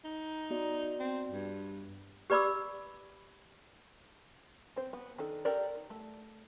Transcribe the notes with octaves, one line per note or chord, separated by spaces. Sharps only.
D#4
B3 F#4 D5
C4
G2
G4 B4 D5 B5 D6 E6
C4 C5
B3
D#3 D4 A4
G4 A4 A#4 D5
D#4
A3